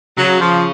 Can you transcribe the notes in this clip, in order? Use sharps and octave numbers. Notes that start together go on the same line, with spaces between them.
C#3 F#3
F3